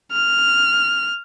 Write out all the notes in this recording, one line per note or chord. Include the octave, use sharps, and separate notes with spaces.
F6